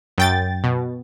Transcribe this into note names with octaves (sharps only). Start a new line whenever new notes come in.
F#2 G5 A6
B2